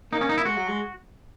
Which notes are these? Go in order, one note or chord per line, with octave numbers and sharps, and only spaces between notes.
A#3 D#4
C#4
D#4
E4
G#3 F#4
F#3
G#3